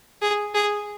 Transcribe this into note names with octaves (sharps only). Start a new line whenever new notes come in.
G#4
G#4